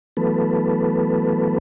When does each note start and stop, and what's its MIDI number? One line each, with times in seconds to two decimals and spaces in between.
0.17 1.58 52
0.17 1.58 54
0.17 1.58 57
0.17 1.58 59
0.17 1.58 69
0.17 1.58 71